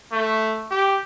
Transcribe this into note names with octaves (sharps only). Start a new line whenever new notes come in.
A3
G4